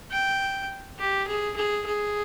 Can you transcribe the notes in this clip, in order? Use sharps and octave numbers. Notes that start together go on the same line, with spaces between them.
G5
G4
G#4
G#4
G#4